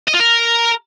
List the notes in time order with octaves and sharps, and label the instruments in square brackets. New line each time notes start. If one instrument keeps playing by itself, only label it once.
[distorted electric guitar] D#5
F4
A#4